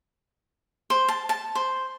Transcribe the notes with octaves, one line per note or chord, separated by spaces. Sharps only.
C5
A5
A5
C5